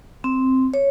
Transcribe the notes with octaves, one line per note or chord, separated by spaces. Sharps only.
C4
C#5